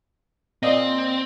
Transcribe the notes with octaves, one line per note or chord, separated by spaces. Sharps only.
A#2 C4 D#5